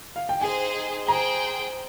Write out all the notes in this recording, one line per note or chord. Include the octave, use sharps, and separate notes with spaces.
F5
G5
D#4 G#4 C5 G#5
G#4 C5 G5 A#5